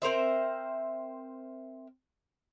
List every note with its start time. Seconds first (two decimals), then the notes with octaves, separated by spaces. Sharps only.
0.02 C4 A#4 C5 E5